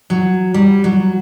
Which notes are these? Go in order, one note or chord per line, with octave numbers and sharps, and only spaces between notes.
F#3
G3
F#3